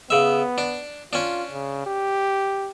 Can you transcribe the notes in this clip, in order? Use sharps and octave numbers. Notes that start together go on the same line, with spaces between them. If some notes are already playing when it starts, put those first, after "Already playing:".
C#3 B3 E5
D4
C#4 D4 F4
C#3
G4